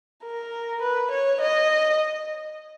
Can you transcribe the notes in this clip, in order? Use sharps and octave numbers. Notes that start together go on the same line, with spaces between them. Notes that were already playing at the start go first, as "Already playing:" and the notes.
A#4
B4
C#5
D#5